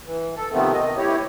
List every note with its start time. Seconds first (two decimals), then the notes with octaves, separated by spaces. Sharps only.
0.06 E3
0.36 A4
0.53 C3 D#3 F3 A3 B3 C4
0.74 D#5
0.97 D2 E4 G4 C#5